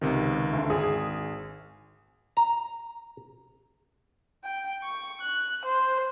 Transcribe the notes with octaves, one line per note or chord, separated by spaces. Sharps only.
C#2 C3 D#3
D2
G#1 G#4
A#5
G5
C#6
F#6
C5